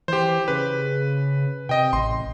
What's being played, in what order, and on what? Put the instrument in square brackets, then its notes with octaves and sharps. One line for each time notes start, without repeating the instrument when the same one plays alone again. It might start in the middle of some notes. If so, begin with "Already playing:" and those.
[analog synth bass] E3 [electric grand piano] G4 C5
[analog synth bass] C#3 [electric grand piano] B4
[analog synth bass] C3 [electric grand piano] D#5 G5
[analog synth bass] A1 [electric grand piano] C6